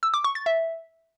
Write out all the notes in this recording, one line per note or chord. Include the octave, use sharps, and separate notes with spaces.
E6
D6
C#6
A6
E5